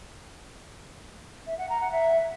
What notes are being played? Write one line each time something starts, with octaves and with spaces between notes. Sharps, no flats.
E5
F#5
A#5
F#5
E5